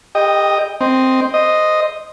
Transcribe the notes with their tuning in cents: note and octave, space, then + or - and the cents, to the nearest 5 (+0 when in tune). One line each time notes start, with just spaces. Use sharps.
G4 +30 D#5 +0 G5 +0
C4 +0 D#5 +5
C5 +0 D#5 +0